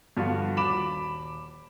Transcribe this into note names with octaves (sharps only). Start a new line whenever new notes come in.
G2 D3 F3 F4 F#4
D#1 B5 D6 E7